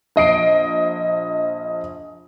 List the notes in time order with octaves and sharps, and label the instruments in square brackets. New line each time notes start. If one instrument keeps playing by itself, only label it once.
[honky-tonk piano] A#1 D#5 C7 D7